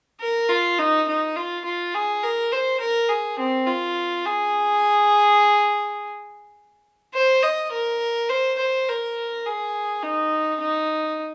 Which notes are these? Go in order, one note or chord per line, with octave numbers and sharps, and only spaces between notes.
A#4
F4
D#4
D#4
F4
F4
G#4
A#4
C5
A#4
G#4
C4
F4
G#4
C5
D#5
A#4
C5
C5
A#4
G#4
D#4
D#4